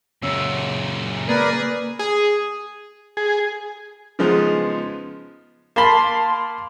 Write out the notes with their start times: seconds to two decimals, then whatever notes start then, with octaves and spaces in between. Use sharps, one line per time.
0.22 F#2 A#2 C#3 E6
1.29 A#3 G#4 A#4 B4 D5
1.99 G#4
3.17 G#4
4.19 C#3 F3 G#3 B3 D#4
5.76 A#3 A5 B5 C6